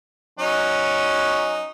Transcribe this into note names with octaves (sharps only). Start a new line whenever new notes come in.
F#3 C#4 D#4